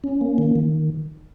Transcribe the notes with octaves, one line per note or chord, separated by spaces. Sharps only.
C#4
A#3
D#3
D#3